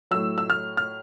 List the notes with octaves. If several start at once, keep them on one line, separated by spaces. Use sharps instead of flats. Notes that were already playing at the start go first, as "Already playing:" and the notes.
A2 F#3 E6
E6
F6
F6